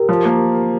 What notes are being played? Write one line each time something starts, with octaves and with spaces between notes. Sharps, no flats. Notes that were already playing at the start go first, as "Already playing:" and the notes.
Already playing: G4 A#4
F3
A#3